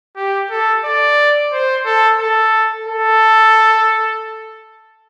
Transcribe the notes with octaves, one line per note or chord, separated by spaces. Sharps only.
G4
A4
D5
C5
A4
A4
A4